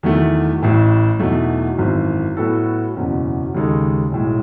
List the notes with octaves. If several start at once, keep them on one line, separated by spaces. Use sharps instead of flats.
E2 D#3 F#3 A3
A1 A2 E3
E2 B2 F#3 A3 D#4
G#1 F#2 E3
A2 F#3 B3 F#4 A4
F#1 E2 B2 F#3 C#4
D#2 C#3 G#3 D#4 A4
B1 A2 G#3